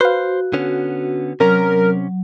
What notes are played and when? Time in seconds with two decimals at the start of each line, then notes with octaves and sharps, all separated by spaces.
0.01 F#4 B4 C5 F5
0.53 D3 B3 C#4
1.40 C3 F#3 C#4 A#4